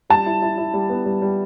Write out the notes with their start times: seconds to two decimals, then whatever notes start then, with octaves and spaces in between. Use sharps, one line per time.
0.10 G3 A5
0.26 E4
0.42 E4
0.58 E4
0.74 G3
0.90 B3
1.06 G3
1.22 G3